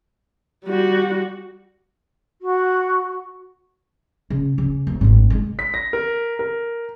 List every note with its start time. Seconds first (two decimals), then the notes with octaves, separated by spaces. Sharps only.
0.65 G3 F#4
2.42 F#4
4.30 C#3
4.58 C#3 C#4
4.87 D1
5.01 G#1 G2
5.30 D#3 G#3
5.59 B6
5.74 A#6
5.93 A#4
6.39 A#4